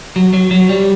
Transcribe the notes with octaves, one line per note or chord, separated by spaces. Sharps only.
F#3
F#3
F#3
G3